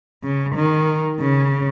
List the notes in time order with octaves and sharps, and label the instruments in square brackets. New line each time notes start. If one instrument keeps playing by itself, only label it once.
[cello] C#3
D#3
C#3